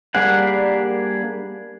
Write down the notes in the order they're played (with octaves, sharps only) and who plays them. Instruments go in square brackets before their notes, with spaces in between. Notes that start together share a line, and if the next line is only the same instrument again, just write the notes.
[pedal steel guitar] G3 A#3 D4 G#4 F#5